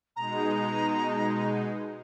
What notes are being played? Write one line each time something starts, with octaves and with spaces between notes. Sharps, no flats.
B2 G#3 D#4 A#5